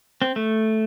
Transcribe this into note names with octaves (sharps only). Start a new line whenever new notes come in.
C4
A3